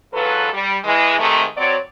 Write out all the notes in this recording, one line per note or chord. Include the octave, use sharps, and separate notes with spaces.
G#2 F#3 F4 A4 B4
G3
E3 G#3
G#2 C3 D#3 A3
F#3 C4 F#4 C#5 D5